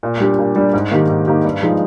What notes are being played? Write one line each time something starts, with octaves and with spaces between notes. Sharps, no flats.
A#2
G3 D4 G4
A#2
G3 D4 G4
G#2
D#3 A#3 D#4 G4
G#2
D#3 A#3 D#4 G4
G2
F3 G#3 D#4